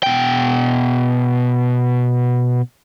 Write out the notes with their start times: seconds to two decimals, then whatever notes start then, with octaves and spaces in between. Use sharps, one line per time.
0.03 B2 G5